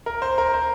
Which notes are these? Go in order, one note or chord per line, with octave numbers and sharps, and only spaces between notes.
A#4
C5
A#4
C5